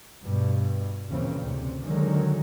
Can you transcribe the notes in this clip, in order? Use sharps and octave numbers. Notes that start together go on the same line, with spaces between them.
G2 B2
D#2 A#2 C#3 E3 C4
D2 C3
D3 D#3 F#3 G#3